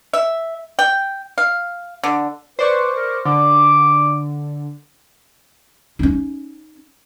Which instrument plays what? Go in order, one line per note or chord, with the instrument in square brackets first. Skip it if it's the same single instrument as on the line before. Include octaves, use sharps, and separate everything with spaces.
[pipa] E5
G5
F5
D3
[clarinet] B4 [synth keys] C5 D5 C#6
[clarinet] A#4
[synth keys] D3 [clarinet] D6
[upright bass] C#4 D#4